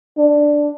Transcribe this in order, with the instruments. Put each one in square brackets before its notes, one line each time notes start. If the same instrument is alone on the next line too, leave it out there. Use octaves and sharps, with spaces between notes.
[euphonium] D4